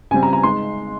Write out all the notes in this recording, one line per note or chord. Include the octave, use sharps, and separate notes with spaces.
C#3 G3 C4 G#5
A#5
A#5
G#3 D#4 C6